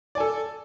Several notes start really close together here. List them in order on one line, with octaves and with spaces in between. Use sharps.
D5 G#5 A4